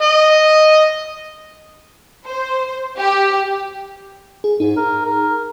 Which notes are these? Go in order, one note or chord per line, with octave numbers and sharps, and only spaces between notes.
D#5
C5
G4
G#4
G#2 D#4 G#4
A#4
A#4